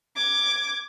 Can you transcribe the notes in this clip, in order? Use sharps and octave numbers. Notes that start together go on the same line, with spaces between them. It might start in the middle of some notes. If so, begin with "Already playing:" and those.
D6 G#6